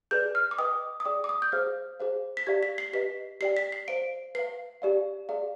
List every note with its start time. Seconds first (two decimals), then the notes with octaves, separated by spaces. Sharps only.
0.11 G#4 B4 D5 G6
0.35 F6
0.51 D6
0.58 B4 D#5 G5 D#6
1.00 D#6
1.05 G#4 D5 G5 D6
1.24 D6
1.29 D#6
1.42 G6
1.52 G#4 C5 F5 F6
2.00 G#4 C5 F5
2.37 B6
2.47 G4 D5 F5 G#6
2.63 B6
2.78 C7
2.93 G4 B4 D#5 B6
3.41 G4 D5 G5 C7
3.57 B6
3.72 C7
3.88 C5 F5 D7
4.35 B4 F5 C7
4.82 G4 D5 F5
5.29 G#4 D5 F5